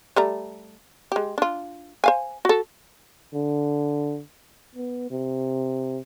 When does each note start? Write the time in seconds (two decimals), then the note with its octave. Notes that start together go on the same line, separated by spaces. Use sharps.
0.16 G3 A3 A#5
1.12 G#3 G4
1.38 D4 F4
2.04 C5 F5 G#5
2.45 F#4 A4
3.34 D3
4.75 B3
5.11 C3